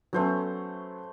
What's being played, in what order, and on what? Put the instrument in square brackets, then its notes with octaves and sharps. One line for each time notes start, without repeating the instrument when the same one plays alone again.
[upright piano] F#3 B3 C#4 [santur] A3 C5 C#5